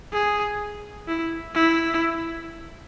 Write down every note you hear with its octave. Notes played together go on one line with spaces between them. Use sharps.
G#4
E4
E4